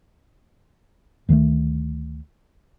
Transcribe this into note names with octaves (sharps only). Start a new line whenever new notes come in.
D2 D#3 F3 A3